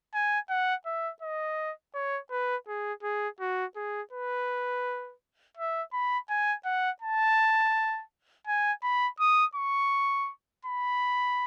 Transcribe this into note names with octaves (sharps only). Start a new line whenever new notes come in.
G#5
F#5
E5
D#5
C#5
B4
G#4
G#4
F#4
G#4
B4
E5
B5
G#5
F#5
A5
G#5
B5
D#6
C#6
B5